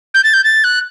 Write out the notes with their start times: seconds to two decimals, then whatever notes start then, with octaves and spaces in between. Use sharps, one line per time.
0.14 G6
0.24 A6
0.34 G6
0.44 A6
0.64 F#6